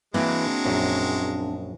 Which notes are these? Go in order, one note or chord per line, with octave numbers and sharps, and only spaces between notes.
E3 F#3 G#3 A#3 C4 D4
A#1 F#2